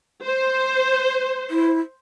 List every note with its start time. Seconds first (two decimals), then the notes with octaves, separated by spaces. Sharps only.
0.25 C5
1.51 E4